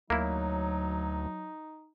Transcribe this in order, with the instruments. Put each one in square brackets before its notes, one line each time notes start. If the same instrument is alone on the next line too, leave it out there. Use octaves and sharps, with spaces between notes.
[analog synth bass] D2 [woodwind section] F#3 [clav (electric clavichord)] A#3 E4 [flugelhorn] D#4